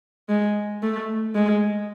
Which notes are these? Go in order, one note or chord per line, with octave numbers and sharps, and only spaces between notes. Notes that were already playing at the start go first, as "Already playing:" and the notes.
G#3
A3
G#3